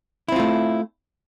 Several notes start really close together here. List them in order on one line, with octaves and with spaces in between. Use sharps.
E4 C4 F4 A3